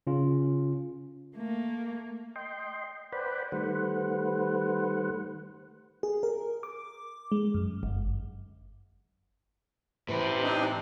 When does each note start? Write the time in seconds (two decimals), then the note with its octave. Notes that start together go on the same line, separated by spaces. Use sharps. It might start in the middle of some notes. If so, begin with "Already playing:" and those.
0.07 C#3 C#4 F4
1.36 A3 A#3
2.36 D#5 G5 C6
3.12 B4 C5 D5 F#5 G5 B5
3.52 D#3 G3 A3 B4 C5 F#5
6.03 G#4
6.23 A#4
6.63 D6
7.32 G#3
7.54 F#2
7.83 G1
10.09 A2 C3 E3 B4 B5
10.43 C4 D4 D#4